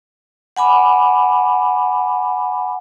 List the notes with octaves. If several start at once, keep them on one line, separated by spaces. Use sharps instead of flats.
F#5 G#5 B5 D6